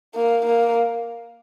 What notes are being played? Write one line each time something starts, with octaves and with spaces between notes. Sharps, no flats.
A#3
A#3